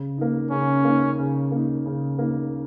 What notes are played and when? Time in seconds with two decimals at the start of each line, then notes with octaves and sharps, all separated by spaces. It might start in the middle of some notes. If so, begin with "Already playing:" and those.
Already playing: C#3
0.18 A#3 D#4
0.51 C#3 C#4
0.84 A#3 D#4
1.19 C#3
1.51 A#3 D#4
1.86 C#3
2.19 A#3 D#4